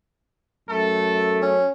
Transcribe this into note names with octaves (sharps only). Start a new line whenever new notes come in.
F#2 A3 A4
C#4